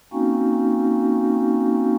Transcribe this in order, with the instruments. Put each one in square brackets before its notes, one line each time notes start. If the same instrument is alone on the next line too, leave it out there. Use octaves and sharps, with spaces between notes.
[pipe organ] A#3 C4 C#4 D#4 F#4